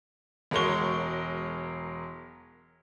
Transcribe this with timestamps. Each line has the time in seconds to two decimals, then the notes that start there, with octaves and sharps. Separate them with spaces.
0.51 E1 F#3 G#3 A#4 C#6 G7